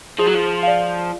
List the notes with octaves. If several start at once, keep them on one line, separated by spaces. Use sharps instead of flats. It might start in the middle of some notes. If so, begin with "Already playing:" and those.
F3 G#4
F#3
F3
D5 F5